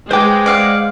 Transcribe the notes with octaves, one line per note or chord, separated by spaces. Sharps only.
G#3 B4 C5 G5 D6
D5 F5 F#5